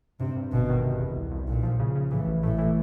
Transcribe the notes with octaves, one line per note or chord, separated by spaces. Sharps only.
G2 C3
G2
G1 B2
D#3
C3
E2
C2
C2
B1 A#2
F3
C#3
C#3
A2 E3
A1
A2 A3
E3